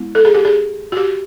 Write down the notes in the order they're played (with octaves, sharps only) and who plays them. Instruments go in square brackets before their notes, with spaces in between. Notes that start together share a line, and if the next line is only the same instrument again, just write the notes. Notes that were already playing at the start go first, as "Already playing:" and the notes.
Already playing: [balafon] G#3 B3 E4
A4
G#4
G4
G#4
F#4
G4